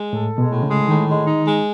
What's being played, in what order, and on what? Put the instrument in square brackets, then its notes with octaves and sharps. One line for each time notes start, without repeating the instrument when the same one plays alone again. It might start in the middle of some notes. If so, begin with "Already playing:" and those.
Already playing: [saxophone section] G#3
[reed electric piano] A2 [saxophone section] A4
[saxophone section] G#3
[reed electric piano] B2
[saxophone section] A2
[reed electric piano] C#3
[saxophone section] G#3
[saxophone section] A2 [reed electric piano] D#3
[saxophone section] G#3
D#4
G#3